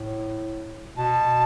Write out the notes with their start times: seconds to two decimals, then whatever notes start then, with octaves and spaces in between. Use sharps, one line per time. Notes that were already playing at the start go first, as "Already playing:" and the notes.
Already playing: A2
0.97 B2 A5